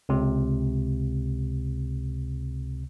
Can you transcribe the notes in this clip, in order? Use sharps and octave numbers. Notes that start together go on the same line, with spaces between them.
C#2 C3